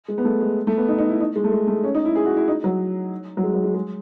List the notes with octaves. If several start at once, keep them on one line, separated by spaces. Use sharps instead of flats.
G#3
B3
A3
G#3
A3
B3
D#4
D#4
E4
D#4
G#3
A3
G#3
A3
C#4
D#4
E4
G#4
F#4
E4
D#4
F#3
F#3
G#3
F#3
G#3
G#3